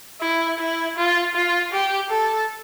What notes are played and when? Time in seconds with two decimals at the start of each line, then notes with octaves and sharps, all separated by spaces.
0.21 E4
0.59 E4
0.97 F4
1.35 F4
1.72 G4
2.10 A4